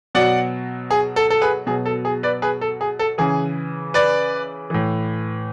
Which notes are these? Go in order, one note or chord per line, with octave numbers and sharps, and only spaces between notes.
B2 F#3 D5 F#5
G#4
A4
A4
G#4 B4
B2 F#3 G#4
A4
G#4
B4 D5
G#4 B4
A4
G#4
A4
C#3 E3 G#4
B4 D5
A2 E3